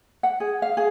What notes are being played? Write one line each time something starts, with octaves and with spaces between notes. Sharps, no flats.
F#5
G#4
F5
G#4